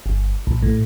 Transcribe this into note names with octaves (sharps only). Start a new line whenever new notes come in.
G1
A#1
A2